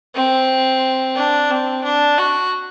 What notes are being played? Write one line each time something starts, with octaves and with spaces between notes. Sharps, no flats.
C4
D4
C4
D4
F#4